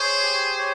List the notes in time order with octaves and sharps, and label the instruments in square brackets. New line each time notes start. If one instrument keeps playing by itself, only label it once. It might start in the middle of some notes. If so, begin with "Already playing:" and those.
Already playing: [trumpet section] G#4 C5 [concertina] C#5
[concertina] G4
C#5